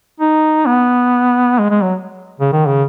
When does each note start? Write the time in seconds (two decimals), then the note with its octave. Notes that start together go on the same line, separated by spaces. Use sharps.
0.20 D#4
0.66 B3
1.59 G#3
1.70 G#3
1.82 F#3
2.40 C#3
2.52 D#3
2.67 C#3